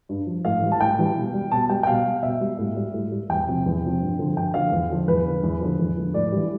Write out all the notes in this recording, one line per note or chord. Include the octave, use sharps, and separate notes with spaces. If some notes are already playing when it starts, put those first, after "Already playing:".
G2
F3
A2 F5
E3 G3
A5
A2 G5
E3 G3
B2
G3
B2 A5
G3 G5
G5
B2 F5
G3
B2 E5
G3
A2
G3
A2
G3
E2 G5
C3 F3
E2
C3 F3
G2
D3 F3
G2 G5
D3 F3 F5
E2
D3 F3
E2 B4
D3 F3
E2
D3 F3
E2
D3 F3
A2 D5
E3 G3